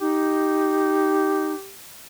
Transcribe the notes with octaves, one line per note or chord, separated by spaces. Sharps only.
D#4 G4